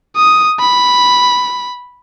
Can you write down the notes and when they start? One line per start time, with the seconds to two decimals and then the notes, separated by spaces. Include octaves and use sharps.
0.16 D#6
0.60 B5